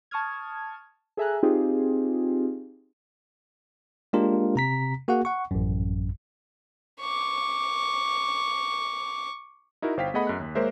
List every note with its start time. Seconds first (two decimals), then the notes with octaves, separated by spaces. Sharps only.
0.11 A5 C#6 D#6 F6 G#6
1.17 G#4 A4 E5 G#5 A#5 F#6
1.43 C4 D#4 F4 G4 G#4
4.13 G#3 A#3 D4 F4 G4 A#4
4.56 C3 A#5 B6
5.08 A#3 F#4 G#4 F#5
5.25 F#5 C#6
5.51 A1 F#2
7.01 C#6 D6
9.82 D#4 E4 F#4 A#4
9.97 G1 C5 F5 G5 B6
10.14 A3 B3 G#4 D#5 F#5 B5
10.27 F#2 F#6
10.40 D#2
10.55 G#3 A#3 A#4 C5 C#5 E5